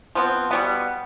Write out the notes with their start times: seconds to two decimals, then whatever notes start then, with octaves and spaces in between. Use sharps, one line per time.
0.15 F3 B3 C4
0.51 B2 G3 B3